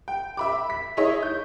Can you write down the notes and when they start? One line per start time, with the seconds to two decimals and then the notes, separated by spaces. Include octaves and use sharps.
0.08 G5
0.37 E5 B5 D6
0.70 B6
0.97 D#4 E4 G#4 C#5 D#5 E5
1.23 G6